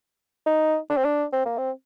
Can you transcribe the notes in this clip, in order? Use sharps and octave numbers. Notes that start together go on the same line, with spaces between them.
D#4
D4
C4
D4
C4
A#3
C4